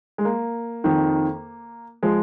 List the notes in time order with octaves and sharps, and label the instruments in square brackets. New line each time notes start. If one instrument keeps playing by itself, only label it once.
[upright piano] G#3
A#3
F2 D#3
F3 G#3